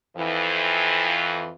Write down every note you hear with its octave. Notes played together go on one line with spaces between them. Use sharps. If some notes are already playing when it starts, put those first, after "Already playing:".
F2 E3